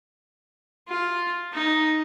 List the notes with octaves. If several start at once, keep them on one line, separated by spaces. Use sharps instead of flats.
F4
D#4